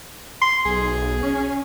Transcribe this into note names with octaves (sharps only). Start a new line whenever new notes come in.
C6
B1 G#4
C#4